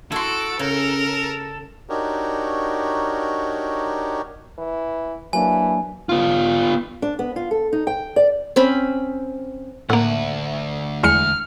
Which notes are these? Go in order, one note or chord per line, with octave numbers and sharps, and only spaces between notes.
E4 F#4 A4 C6 D7
C#3 A#4
D4 D#4 F#4 G4 A#4 C#5
E3
E3 F#3 A#3 D4 G#5
B3 F4
D4
B3
F4
A4
D#4
G5
D5
C4 C#4 B5
D2 A2 A#3 F#5
E2 G#3 F6 C#7